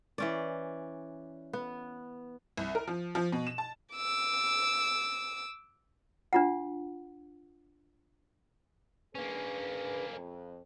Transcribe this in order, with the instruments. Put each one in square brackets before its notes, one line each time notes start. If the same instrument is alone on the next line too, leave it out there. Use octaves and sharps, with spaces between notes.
[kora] E3 C#4 D5
B3
[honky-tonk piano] C2
A#4
F3
F3
B2
E7
A5
[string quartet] D6 E6
[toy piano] D4 F4 F#5
[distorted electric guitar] A#3 C#4 [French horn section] D4 G#4 B4
[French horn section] F2